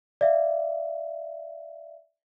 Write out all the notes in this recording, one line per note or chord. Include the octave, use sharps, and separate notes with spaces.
D5 E5 F5